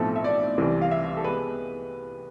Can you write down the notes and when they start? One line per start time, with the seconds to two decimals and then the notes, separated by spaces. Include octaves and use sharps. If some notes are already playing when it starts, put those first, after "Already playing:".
Already playing: B1 A2 F3 A3 C4 A4
0.16 E5
0.24 D5
0.58 C2 C3 E3
0.82 F5
0.91 E5
1.17 A4
1.24 G#3 B3 B4